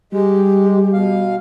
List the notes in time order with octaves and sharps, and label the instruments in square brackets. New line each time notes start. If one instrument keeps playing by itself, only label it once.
[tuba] G3 [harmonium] G#3 [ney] G4
[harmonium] B2 F5